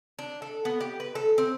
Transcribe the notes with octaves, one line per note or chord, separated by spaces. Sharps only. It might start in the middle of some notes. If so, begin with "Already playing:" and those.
D4
A4
B3
G4
B4
A4
C4